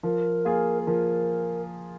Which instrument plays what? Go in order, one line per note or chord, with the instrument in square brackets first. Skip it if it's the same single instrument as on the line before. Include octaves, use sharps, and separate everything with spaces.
[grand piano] F3 [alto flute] A#4
[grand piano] A#3 F4 G#4
[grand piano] F3 [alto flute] A#4